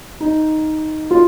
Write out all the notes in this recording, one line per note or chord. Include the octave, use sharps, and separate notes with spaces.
D#4
F4